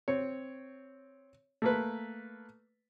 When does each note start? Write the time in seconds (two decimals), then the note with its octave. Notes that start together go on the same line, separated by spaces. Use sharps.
0.08 C4 C#5
1.62 A3 A#3 B4